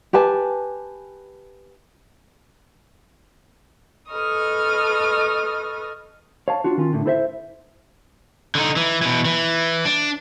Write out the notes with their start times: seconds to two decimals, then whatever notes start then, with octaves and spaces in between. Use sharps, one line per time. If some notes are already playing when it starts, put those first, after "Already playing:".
0.13 G4 B4 G#5 A5
4.11 A4 B4 D#5 C#6 D#6 F6
6.48 C#5 F5 A5
6.64 D4 F4 F#4
6.77 D#3 C#4 F4
6.93 A2 D3
7.06 E4 A4 C5 D5 E5
8.55 D3 D#4
8.76 E3
9.02 B2 E3
9.25 E3
9.85 D4